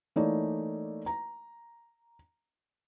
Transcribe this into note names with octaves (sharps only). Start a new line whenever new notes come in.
E3 A3 A#3 D#4 C#5 D5
A#5